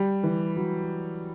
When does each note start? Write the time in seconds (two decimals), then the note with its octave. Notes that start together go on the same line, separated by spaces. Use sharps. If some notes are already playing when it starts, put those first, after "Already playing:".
Already playing: G3
0.24 E3
0.57 F#3